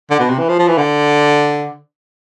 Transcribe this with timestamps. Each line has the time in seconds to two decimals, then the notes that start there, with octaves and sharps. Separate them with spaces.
0.11 D3
0.20 B2
0.30 C3
0.39 E3
0.49 F3
0.59 F3
0.68 E3
0.78 D3